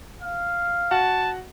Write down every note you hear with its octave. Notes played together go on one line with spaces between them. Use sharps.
F5
F#4 F#5 A5